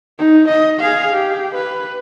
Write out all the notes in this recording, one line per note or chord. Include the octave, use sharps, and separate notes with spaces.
D#4
D#5
G#4 F5
G4
B4